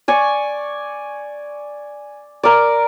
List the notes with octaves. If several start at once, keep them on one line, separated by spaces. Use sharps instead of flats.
D5 G#5 C#6
A#4 D5